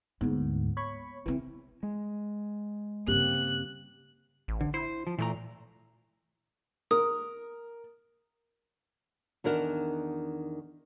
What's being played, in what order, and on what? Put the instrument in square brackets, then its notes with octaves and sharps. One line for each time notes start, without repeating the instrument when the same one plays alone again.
[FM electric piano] D2 G#2 [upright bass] A#3 B3
[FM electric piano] C#5 B5 C#6
[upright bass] C#3 C4 [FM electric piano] E3
[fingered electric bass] G#3
[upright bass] G2 C#3 [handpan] A#3 C4 G4 [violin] F#6
[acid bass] A1
[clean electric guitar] D3
[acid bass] E4 [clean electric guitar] C5
[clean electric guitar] F3
[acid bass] A#2 [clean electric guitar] E3 A3 A#5
[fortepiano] A#4 [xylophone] D#6
[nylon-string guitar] E2 D#3 D4 A#4 F#5